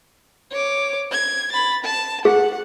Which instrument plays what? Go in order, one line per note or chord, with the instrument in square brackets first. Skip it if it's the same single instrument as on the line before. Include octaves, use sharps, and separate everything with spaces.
[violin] C#5 D6
G#6
B5 A6
A5
[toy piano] G#4 [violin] F#5